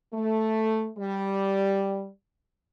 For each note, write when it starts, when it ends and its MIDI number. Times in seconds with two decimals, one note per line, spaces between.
0.13 0.88 57
0.98 2.08 55